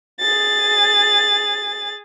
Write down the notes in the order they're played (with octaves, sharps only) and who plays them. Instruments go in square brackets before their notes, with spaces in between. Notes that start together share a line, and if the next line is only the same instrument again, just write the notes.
[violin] G#4 A6